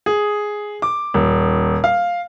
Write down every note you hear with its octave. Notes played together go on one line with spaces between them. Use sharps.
G#4
D6
D#1
F5